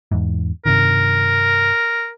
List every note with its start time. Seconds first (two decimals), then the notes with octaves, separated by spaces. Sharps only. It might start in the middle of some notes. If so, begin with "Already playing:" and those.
0.11 E2 G#2
0.66 G2 C3 D#3 A#4